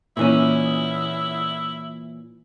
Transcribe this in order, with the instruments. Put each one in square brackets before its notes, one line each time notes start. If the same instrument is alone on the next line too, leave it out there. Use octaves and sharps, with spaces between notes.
[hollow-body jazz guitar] A#2 E3 C#4 [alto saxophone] E4